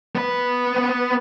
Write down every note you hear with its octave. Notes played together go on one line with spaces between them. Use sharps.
B3 B4